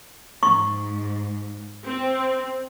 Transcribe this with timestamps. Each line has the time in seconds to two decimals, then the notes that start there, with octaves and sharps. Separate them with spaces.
0.43 G#2 C#6
1.85 C4